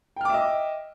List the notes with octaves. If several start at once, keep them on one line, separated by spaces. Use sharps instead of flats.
D#5 E5 G5 D6 F6